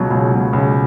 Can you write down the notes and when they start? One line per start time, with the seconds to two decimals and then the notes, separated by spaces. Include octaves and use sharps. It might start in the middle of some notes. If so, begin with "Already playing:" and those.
Already playing: C#2 B2 F#3
0.10 C#2
0.32 B2 F#3
0.53 C#2